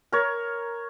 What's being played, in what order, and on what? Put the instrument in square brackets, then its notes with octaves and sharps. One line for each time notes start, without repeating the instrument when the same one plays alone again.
[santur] A#4 C#5